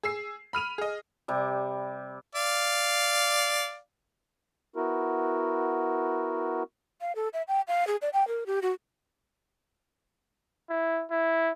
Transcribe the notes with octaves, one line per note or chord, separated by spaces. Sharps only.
G#4 E6 C7
B5 F6 D#7 F7
G#4 D#5
C3 G3
D5 F5
B3 E4 F#4 A#4
F5
A4
E5
G5
F5
G#4
D5
G5
A#4
G4
F#4
E4
E4